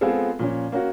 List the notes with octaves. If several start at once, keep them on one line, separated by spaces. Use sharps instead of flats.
G#3 B3 C4 F4 G#4 A4
A#2 F3 C#4
A#3 C#4 F#4